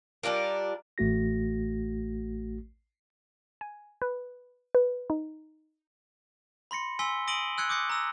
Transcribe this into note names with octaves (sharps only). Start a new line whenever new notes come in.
G3 D4 F4 A#4
A1 A3 F#4 A#6
G#5
B4
B4
D#4
B5 C6 A#6 C#7
G#5 C6 E6 B6 G7
D#6 A#6 D7 D#7 F#7 G7
E6 F#6 G#6 C#7
D6 D#6 G6 A#6 C#7
A#5 E6 A#6